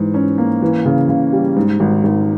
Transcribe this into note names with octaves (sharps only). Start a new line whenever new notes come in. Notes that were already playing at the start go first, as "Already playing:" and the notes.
Already playing: G#2 E3
C#4
A#3
E3
C#3
C#3
G3
G#2
G#1
G#1